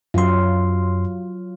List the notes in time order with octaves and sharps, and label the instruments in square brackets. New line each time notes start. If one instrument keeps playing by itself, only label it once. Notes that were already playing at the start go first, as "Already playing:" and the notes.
[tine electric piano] F#2 C6 [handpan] F#3 F4